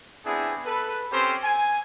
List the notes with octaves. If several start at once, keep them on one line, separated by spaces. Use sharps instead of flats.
B3 C4 D4 E4 G#4
A4 B4
C4 C#4 G4 A4 C5
G#5